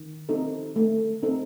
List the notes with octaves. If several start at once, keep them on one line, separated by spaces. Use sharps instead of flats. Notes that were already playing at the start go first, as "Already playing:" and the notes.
Already playing: D#3
C4 D#4 A4
A3
C4 D#4 A4